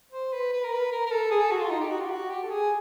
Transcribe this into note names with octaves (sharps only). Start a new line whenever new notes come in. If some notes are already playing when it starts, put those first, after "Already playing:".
C5
B4
B4
A#4
B4
A#4
A#4
A4
G#4
A4
F#4
F4
D#4
G4
F#4
F4
G4
F#4
G4
A4
G#4